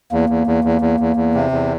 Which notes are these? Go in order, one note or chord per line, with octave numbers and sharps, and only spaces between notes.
E2 A#3
E2
E2
E2
E2
E2
E2
C3
E2